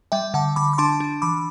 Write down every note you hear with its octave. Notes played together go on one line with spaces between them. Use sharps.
G3 E5 G5
D3 F#5 A5
D3 B5 D6
D6
D4 A5 C6
D4
E3 B5 D6